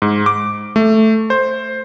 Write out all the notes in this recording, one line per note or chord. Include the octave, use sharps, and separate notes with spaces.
G#2
D6
A3
C5